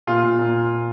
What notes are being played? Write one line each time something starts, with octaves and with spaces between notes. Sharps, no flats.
A#2 F4
A#2
A#2